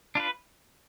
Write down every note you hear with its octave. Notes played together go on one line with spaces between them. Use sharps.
D4 F4 B4